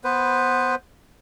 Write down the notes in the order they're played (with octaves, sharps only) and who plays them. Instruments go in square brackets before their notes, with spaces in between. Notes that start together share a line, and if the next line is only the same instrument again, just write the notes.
[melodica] B3 B4 C5